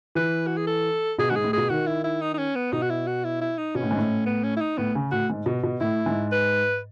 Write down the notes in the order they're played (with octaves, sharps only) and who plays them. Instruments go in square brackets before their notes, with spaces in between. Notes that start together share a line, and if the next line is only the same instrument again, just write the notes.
[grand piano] E3 [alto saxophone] B4
[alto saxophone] F#4
G#4
A4
[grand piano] B2 [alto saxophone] G#4
[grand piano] G#2 [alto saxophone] F#4
[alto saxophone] G#4
[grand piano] A2
[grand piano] B2 [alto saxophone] G#4
[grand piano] D#3 [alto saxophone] F#4
[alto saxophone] E4
E4
D#4
D#4
C#4
B3
[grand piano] B2 [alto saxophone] D#4
[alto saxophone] F#4
E4
F#4
E4
E4
D#4
[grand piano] B2 [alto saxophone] C#4
[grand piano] A2
G#2
A2
[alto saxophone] B3
C#4
E4
D#4
[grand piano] A2 [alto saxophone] B3
[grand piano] C#3
[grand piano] A2 [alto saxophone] F#4
[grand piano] G#2
B2
B2
[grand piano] A2 [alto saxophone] E4
[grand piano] G#2
[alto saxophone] B4